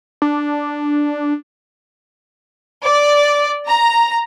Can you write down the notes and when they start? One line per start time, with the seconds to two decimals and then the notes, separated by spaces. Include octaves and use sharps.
0.22 D4
2.84 D5
3.67 A#5